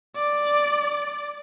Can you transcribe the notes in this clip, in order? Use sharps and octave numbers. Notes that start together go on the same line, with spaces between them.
D5